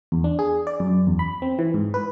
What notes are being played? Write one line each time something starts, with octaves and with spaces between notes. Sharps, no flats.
E2
D4
G#4
D5
F#2
E2
B5
C4
E3
G#2
B4